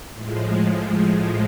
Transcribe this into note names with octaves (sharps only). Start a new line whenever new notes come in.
A2 F3 G#3